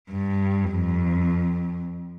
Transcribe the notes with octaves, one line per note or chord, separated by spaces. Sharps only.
G2
F2